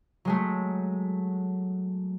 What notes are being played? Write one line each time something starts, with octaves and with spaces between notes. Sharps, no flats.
F#3 G#3 A3